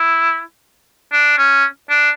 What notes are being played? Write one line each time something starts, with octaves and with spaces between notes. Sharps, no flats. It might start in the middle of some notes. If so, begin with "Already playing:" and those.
Already playing: E4
D4
C#4
D4